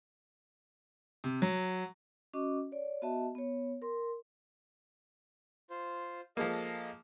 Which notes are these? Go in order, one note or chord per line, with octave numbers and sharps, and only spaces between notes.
C3
F#3
C#4 F#4 D#5 D6
C#5 D5
B3 F#4 D#5 E5 A5
B3 C#5
A#4 C6
F4 C5
F3 G#3 A#3 A4 D#5 F5